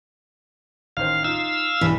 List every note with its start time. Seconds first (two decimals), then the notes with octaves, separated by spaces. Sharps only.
0.97 A1 D#3 C5 F5
1.24 D#4 F4 F5 E6
1.81 B1 G2 E3